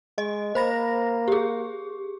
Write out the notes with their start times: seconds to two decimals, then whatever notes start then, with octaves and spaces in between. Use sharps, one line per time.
0.18 G#3 D#5
0.55 A#3 C5 B5 A#6
1.28 G4 G#4